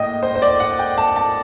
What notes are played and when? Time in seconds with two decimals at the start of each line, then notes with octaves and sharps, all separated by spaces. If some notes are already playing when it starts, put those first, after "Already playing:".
Already playing: A2 A#3 D#5 G5
0.23 C5
0.35 C5
0.42 D5
0.60 F#5
0.79 G5
0.98 A5
1.16 A5